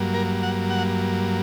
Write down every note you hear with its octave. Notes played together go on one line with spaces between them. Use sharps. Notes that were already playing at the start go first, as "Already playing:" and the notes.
Already playing: G2 F#3 A#3
A#4
F#5
F#5